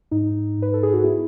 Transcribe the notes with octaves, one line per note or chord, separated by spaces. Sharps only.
G#2 D#4
G#2 B4
A4
G#4
F#4
B3 E4